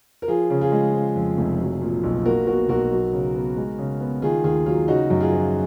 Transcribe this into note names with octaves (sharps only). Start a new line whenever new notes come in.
A#4
F3 F4 G#4
C#3
F4 G#4
G#3
F3
F2
F1
F#3
A#2
B1
A#3 F#4 A#4
B2 F#4 A#4
B1 F#4 A#4
F#3
C#3
B3
G#3
C#3
B3
D#3 F4 G#4
D#2 F4 G#4
F#3 F4
C#3 D#4 F#4
F#2
F4 G#4
F3